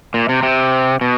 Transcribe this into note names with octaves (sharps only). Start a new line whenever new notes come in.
A#2
C3
C3
B2